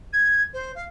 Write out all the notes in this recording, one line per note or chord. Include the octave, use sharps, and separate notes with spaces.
G#6
C5
F5